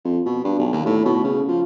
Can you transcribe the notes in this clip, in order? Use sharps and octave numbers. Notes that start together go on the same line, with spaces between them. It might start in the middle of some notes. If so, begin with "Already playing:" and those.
F2
B2
G2
B1
D#2
A2
B2
C#3
F3